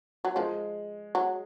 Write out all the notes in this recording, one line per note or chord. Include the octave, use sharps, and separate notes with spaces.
F#3
F3 G#3
F#3